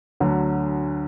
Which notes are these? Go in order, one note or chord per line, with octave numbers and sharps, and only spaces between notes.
D2 D3 F#3